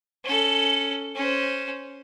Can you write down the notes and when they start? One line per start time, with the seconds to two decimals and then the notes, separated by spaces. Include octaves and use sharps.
0.24 C#4 A4
1.15 C#4 C5